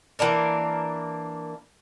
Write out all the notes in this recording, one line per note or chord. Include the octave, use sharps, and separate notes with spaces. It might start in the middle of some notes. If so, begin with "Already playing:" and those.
E3 A#3 D4 A#4